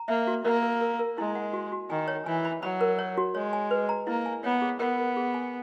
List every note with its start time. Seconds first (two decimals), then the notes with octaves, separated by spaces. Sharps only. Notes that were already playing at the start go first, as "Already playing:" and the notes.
Already playing: A#5
0.08 A#3 E5
0.27 F#4
0.45 A#3 A#4
0.63 A#4
0.81 A#4
0.99 A#4
1.18 G#3 E4
1.35 F#5
1.53 F#4
1.72 F#4
1.90 D#3 G#5
2.08 C#5
2.26 E3 G#5
2.45 B5
2.63 F#3 B5
2.81 A#4
2.99 C#5
3.18 F#4
3.35 G#3 C#5
3.53 G#5
3.71 B4
3.89 A#5
4.07 A#3 E4
4.26 G#5
4.44 B3 C#5
4.62 G#4
4.79 B3 A#4
4.98 A#4
5.17 G#4
5.34 G#5